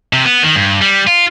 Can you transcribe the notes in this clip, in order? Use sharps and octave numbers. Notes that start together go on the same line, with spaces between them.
C3
B3
D#3
G2
G3
F4